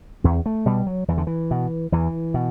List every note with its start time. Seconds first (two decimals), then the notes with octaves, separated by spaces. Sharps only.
0.24 E2 C4
0.46 A3
0.66 B2 G3
0.87 F#3
1.08 E2 E3
1.18 D3
1.27 E3
1.51 B2
1.92 E2 E3
2.34 B2